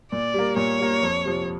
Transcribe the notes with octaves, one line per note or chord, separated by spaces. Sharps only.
A#2 D5
G3 A#3
A#2 C#5
G3 A#3
F2
C3 F3